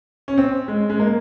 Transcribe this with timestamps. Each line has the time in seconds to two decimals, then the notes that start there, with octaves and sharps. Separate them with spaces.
0.28 C#4
0.38 C4
0.68 G#3
0.90 G#3
0.99 A#3